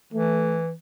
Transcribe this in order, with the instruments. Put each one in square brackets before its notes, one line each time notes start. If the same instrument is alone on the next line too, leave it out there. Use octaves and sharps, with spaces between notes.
[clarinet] E3 [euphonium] A3